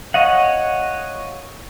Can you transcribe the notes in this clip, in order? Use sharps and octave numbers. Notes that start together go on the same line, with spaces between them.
C#5 D#5 F5 F#5